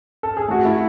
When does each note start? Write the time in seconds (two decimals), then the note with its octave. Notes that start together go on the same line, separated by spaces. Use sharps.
0.23 A4
0.37 G#4
0.48 A3 F#4
0.65 A3 E4